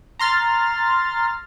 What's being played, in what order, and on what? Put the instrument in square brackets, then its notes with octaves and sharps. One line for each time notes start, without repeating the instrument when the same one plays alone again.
[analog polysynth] A#5 C6 F6 A6